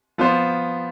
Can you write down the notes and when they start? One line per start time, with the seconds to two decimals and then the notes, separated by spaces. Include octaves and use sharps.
0.18 F3 B3 F4 C5